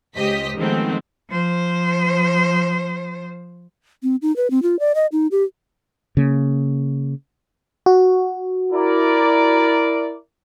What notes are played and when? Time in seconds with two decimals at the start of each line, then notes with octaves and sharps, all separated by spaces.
0.16 C#2 G4 C5 D#5 B6
0.57 D#3 F3 G#3 A3 B3 C4
1.30 F3 C5
4.03 C4
4.22 D#4
4.36 B4
4.51 C4
4.63 F4
4.79 D5
4.95 D#5
5.12 D#4
5.31 G4
6.17 C#3 A#3
7.86 F#4
8.72 E4 A#4 D5